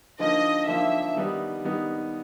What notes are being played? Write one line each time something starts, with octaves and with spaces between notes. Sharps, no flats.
D3 F3 A#3 D#4 D#5
D3 F3 A#3 D#4 E5
D#3 G3 B3 D#4
D#3 G3 B3 D#4